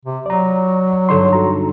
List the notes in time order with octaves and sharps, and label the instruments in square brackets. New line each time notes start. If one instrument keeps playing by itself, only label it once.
[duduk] C3
[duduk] F#3 [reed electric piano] D5 A#5
[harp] G2 D3 D#4 [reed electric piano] A4 C#5 C6
[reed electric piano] F#4 A#5